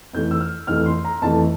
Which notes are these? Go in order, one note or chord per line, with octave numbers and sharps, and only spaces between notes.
F2 E3 A3 G6
E6
F6
F2 E3 A3 F6
C6
A#5
F2 E3 A3 A5